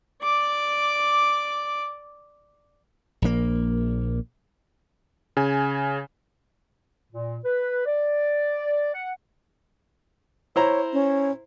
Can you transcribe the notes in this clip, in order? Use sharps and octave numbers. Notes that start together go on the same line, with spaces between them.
D5 D6
A#1 A#3
C#3 G#5
A#2
B4
D5
F#5
E4 C5 C#5 A#5
C#4